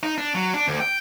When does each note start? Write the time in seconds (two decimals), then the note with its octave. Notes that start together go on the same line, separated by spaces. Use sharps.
0.03 D#4
0.18 D4
0.35 F#3
0.54 D4
0.68 D2
0.80 G5